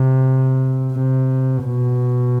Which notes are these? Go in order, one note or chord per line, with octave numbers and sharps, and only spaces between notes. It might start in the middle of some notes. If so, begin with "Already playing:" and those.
Already playing: C3
C3
B2